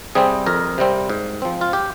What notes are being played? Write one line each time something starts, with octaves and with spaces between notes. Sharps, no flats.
C3 G3 C4 G#4
F2 A#4
C3 G3 C4
G#2
F3 C4
F4
G4